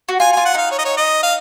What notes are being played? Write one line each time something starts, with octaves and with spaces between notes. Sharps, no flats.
F#4
F4 G#5
F4 G#5
F#5
D#4 F5
C#5
D#5
C#5
D#5
F5